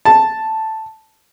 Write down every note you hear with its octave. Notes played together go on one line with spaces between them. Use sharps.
A5